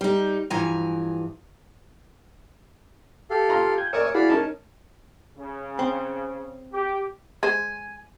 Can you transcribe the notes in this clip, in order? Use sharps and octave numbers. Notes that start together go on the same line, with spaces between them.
G3 D#4
G2 E3 F3 G#5 A#5
G4 A4 F5
F4 A#5 C6
G5 G#5
A#4 C#5 D5 E5 G#5 C#6 D#6
E4 F#4 G#4 D5 F5 B5
C#4 D#4 A#4 A5
C#3
C4
G4
G#3 C5 G#5